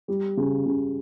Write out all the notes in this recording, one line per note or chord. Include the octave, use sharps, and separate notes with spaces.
G3
C#3
C#3